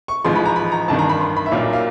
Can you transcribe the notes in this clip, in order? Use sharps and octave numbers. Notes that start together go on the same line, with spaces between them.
C#6
A1 G#2 F3 G#3 C6
B5
A#5
B5
A#5
A1 G2 D#3 A5
A#5
B5
C6
B5
E5
B1 A#2 F#3 A#3 F5
F5